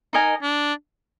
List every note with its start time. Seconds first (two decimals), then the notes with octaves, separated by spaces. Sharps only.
0.13 D#4 A#4 D#5 G#5
0.42 D4